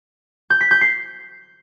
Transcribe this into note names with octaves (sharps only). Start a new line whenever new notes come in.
G6
B6
G6
C7